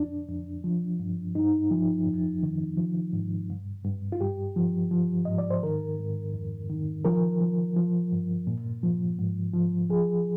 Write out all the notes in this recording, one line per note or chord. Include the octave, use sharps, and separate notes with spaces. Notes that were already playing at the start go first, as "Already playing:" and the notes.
Already playing: F2 D4
F2
F3
G2
G2 D#4
F3
F2
D#3
F3
G#2
G2
G2
F4
G2 G4
F3
F3
G#2 D#5
D5
C5
D#3 A#4
G#2
F2
D#3
F3 A#4
F3
F3
G2
A#2
F3
G#2
F3
F3 G#4